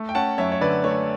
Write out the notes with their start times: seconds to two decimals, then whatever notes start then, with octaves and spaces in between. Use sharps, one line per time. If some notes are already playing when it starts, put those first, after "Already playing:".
Already playing: A3
0.09 G5
0.15 C#4 F#5 A5
0.38 F#2 C#5 E5
0.52 C#5
0.61 D3 B4 D5
0.84 A3 C#5